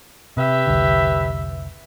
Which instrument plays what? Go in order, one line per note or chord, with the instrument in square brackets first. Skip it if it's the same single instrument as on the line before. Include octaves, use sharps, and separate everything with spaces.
[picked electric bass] C3 [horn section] G4 B4 E5
[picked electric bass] F1 C2 D3